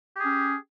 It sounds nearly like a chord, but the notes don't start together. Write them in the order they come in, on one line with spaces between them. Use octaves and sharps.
G4 G#4 C#4